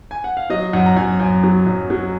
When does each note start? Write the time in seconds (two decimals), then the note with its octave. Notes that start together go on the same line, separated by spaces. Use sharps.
0.11 G#5
0.24 F#5
0.37 F5
0.50 F#3 D#5
0.73 F#2 F#5
0.86 A#5
0.97 F#2 G#5
1.20 F#2 G#5
1.43 F#3
1.67 F#2
1.90 F#3